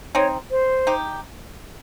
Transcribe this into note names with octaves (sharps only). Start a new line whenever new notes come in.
C4 D#4 C#5
C5
D#4 G4